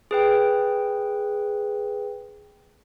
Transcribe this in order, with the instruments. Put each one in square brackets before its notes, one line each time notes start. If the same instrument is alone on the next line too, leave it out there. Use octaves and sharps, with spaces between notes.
[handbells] G#4 B4 G5